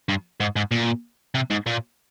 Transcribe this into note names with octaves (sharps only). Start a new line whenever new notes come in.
G2
G#2
G#2
A#2
C3
G#2
A#2